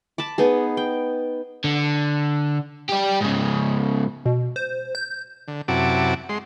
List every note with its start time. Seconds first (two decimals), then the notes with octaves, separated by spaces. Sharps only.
0.18 A5 B5 D6
0.38 B3 D#4 G#4
0.77 G5
1.64 D3
2.89 G4 D5
3.21 G#2 C#3
4.26 B2
4.56 C5
4.95 G6
5.48 D3
5.68 F#2 C3 E4 F#4 A5 D6
6.29 G#3 C6